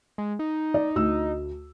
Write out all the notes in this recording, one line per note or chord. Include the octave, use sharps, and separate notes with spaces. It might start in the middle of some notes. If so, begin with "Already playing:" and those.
G#3
D#4
D5
D2 E6